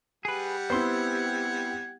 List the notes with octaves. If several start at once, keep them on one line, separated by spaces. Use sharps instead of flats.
G3 G4 G#4 B4 F#5
B3 C4 E4 C5 C6 G#6